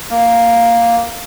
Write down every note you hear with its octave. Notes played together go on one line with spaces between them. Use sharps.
A#3